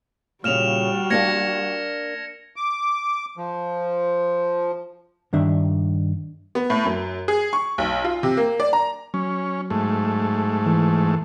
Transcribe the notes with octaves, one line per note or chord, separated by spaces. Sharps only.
A#2 C#3 G3 F#4 F6 E7 F7
A#3 D4 F5 G#6 A#6 C#7
D6
F3
G2 D#3 D4 E5
B3
A2
F#2
G#4
C#6
B1
F4
C3
A#3
D5
A#5
F#3 C#4
G#2 A3
E3